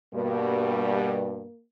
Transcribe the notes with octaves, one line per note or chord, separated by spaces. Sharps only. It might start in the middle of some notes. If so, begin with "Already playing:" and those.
G2 B2 G3 A#3